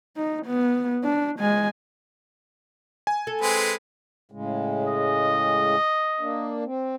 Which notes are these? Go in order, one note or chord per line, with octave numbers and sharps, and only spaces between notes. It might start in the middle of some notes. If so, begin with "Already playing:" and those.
D#4
B3
D4
G#3 G#5
G#5
A4
G#3 C4 B4
A2 C#3 G#3
D#5
A#3 D4
C4